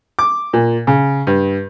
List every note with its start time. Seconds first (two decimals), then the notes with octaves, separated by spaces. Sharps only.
0.19 D6
0.53 A#2
0.87 C#3
1.27 G2